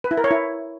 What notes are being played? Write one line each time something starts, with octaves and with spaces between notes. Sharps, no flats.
B4
E4
A#4
C#5
E4